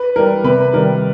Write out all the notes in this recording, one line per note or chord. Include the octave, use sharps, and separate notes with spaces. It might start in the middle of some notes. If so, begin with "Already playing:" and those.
Already playing: B4
E3 G3 A#4
C3 B4
D#3 G3 A#4